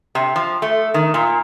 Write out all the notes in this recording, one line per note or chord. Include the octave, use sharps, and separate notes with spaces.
C3
F3
A3
D#3
A#2